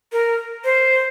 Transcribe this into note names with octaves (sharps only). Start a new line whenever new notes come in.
A#4
C5